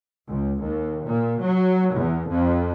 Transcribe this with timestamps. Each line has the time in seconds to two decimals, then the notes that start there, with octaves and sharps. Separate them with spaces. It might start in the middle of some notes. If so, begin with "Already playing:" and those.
0.29 C#2
0.62 D#2
1.04 A#2
1.42 F#3
1.94 E2
2.31 F2